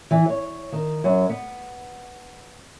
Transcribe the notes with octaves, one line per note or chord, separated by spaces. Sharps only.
E3
C#5
D#3
F#2
B3